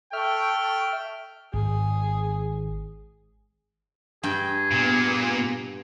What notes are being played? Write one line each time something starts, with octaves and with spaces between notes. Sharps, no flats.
A4 E5 G5 C#6 F6
G#1 G#2 G#4
G2 G#4 G5
A#2 B3